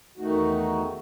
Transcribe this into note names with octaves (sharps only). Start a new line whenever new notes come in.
E2 D#3 A3 D#4 F#4